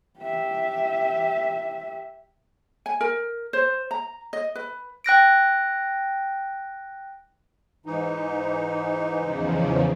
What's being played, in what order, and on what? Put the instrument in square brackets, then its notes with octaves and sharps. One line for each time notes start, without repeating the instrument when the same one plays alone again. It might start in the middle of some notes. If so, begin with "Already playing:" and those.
[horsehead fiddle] G4 E5
[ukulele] G#5
A#4
C5
A#5
D#5
B4
[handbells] G5 F#6 A#6 D7
[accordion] G#2 E3 D#4
[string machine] E2 C#3 F3